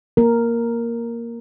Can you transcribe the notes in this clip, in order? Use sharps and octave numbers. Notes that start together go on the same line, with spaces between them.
A#3 A#4